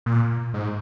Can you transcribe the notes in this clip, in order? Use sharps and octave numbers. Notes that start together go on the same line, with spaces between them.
A#2
G#2